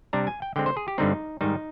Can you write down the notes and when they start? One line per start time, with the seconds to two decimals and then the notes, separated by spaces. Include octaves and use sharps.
0.13 C3 G3 D4 A#5
0.27 G#5
0.42 G5
0.56 D3 G#3 C4 G5
0.66 C5
0.77 G#4
0.88 G4
0.98 G2 D3 G3 C4 D#4
1.41 G#2 D#3 G3 D#4